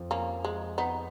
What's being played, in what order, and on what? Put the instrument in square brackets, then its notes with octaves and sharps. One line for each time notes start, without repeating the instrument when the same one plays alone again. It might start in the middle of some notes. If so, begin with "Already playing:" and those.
Already playing: [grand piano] F2 F3
[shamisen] A#3 C#4
G#3
B3 D#4